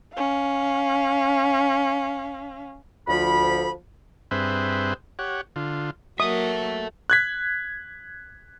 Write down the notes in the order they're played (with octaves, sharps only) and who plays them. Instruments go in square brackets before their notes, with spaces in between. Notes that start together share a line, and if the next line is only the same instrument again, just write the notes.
[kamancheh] C#4 F5
[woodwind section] D2 F3 B5
[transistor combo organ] G2 C4 G#4 B4 C5 E5
G4 C#5 F#5
D3 F4
[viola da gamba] F#3 A#3 A#4 [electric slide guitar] A4 E5 [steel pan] D#6
[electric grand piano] F#6 G#6 B6